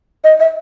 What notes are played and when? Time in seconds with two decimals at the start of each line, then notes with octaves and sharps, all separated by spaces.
0.24 D#5
0.40 E5